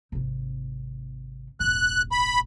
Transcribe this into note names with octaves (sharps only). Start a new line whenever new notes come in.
G#1 C3
E1 A1 F#6
B5